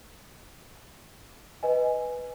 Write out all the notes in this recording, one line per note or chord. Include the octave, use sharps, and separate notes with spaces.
B4 D#5 G#5